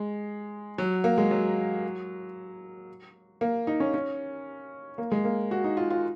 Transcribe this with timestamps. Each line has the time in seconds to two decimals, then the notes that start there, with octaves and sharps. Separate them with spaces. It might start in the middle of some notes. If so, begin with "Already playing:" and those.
Already playing: G#3
0.78 F#3
1.04 A#3
1.18 G#3
1.31 F#3
3.41 A#3
3.67 D#4
3.80 C#4
3.94 C#4
4.98 A#3
5.12 G#3
5.25 A#3
5.51 F#4
5.64 D#4
5.77 F4
5.90 F4